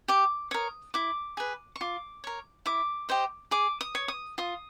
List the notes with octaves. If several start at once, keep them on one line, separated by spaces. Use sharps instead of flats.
G4 D6
A#4 C#5 D#6
E4 D6
G#4 B4
C#6
F4 D6
A#4 C#5
E4 D6
G4 C5 D#5
G#4 D6
D#6
C#5
D#6
F4 D#6